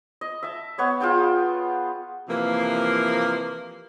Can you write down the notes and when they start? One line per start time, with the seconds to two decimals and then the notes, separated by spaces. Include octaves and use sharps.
0.21 D#5
0.43 E5 A5
0.78 B3 C#5 D#5
1.00 F4 G#4 G5 A5
2.29 C3 E3 F3 A#3